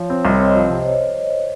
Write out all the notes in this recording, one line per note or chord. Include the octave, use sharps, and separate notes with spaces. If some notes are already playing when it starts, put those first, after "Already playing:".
Already playing: F3 C#5
C4
C2 D#5
C4 C#5
D#5
F3
C3
C5
C#5